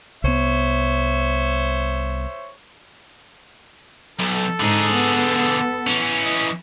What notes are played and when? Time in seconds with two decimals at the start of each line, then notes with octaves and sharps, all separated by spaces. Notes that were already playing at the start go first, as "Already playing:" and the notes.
0.24 C2 B3 C5 C#5 E5
4.20 B1 A4
4.60 G#2 D3 D#4 G#4
4.93 B3
5.87 E3 C#4
6.24 D#5